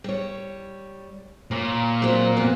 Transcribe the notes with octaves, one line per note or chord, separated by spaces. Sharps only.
G3 C#5
A#2 C#5
F#3 C4
F2 B3